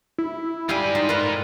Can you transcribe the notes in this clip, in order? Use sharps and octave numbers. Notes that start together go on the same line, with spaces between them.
E4
G#2 G3 G4 F5 G#5
D#4 F4
F4 A#4 B4